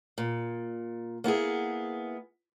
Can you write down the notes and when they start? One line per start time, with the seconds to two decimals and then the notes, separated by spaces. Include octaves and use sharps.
0.18 A#2
1.24 A#3 B3 E4 G#4